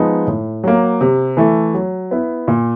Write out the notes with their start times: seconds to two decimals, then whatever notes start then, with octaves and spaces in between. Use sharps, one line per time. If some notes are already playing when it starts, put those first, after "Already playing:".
Already playing: F3 G#3 B3 D#4
0.27 A2
0.64 F#3 A#3
1.01 C3
1.37 E3 A3
1.74 F#3
2.11 B3 E4
2.48 A#2